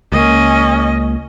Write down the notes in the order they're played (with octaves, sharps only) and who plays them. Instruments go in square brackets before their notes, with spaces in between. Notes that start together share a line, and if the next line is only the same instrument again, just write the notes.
[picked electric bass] C#2 A#3 [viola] C#4 D#5